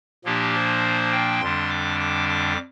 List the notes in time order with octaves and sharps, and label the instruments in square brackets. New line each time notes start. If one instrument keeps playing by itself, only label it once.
[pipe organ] A#2 F3 A#3 D4 G4
C5
G5
F2 D3 G3 D4 C6
D6
D6
D6